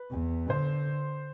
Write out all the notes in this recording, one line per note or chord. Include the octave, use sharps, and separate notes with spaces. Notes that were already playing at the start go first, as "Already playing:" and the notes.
Already playing: B4
E2
D3 C5